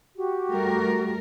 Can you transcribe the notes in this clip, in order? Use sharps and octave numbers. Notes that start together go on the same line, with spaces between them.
F#4 G4
G3 A3 A#4